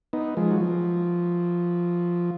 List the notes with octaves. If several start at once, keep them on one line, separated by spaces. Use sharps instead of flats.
B3 D#4
F3 G#3
F#3
F3